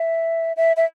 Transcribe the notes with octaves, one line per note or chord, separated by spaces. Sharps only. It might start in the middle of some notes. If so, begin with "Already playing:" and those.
Already playing: E5
E5
E5